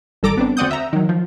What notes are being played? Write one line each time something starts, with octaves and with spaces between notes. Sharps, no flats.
G#1 G3 A4 A#5 D6
B3 C4 D4
D2 C4 D5 F#5 D#6 G6
E5 A#5
D#3 F#3
F3